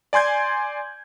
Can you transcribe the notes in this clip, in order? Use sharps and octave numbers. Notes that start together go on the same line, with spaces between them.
D5 G#5 C6 G6 G#6